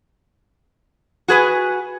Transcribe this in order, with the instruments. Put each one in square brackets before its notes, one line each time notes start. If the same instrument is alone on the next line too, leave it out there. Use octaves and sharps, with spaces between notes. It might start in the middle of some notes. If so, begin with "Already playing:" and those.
[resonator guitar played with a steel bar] F#4 G#4 B4 G#5